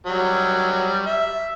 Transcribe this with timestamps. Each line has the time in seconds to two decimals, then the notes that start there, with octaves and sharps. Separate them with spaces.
0.07 F#3 G3
1.06 E5